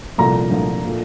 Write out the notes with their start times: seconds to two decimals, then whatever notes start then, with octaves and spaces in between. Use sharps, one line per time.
0.18 C2 A#2 F3 A3 A#5
0.50 C2 A#2 F3 A3
0.85 A#2 A3